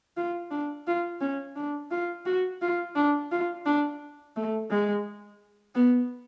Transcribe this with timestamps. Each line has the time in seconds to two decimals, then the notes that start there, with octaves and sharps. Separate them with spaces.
0.17 F4
0.51 D4
0.87 F4
1.21 C#4
1.56 D4
1.91 F4
2.26 F#4
2.62 F4
2.95 D4
3.31 F4
3.66 D4
4.36 A3
4.70 G#3
5.75 B3